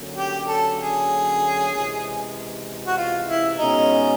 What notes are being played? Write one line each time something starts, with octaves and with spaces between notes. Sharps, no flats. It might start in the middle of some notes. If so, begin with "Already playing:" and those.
Already playing: D3 F#3 A#3 C#4
G4
A4
G#4
C#2 C3 E3 G#3
F#4
F4
E4
B2 G#3 C#4 D#4